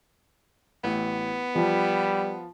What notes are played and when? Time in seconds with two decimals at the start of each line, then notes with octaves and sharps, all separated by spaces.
0.84 A1 B3
1.55 F3 G3